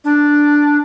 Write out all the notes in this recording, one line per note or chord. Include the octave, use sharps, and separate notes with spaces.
D4